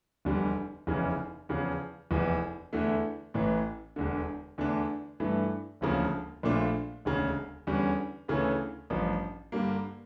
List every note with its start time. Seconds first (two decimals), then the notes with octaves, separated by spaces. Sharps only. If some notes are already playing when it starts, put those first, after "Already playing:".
0.25 F1 E2 D3 G3
0.87 F1 E2 C#3 E3
1.49 E2 C#3 F3
2.11 F1 E2 E3
2.73 E2 D3 A3 E4
3.34 A1 A2 E3
3.96 E1 E2 D3
4.58 E2 D3 A3 D4
5.20 G2 E3 A3
5.81 E1 D2 C#3 F3 A#3
6.43 A#1 A#2 A3 D4 F4
7.05 E1 D2 C#3
7.67 E2 D3 G3 C#4
8.28 D2 C#3 E3 A3 C#4
8.90 A1 G2 F3
9.52 G2 D3 G3 A#3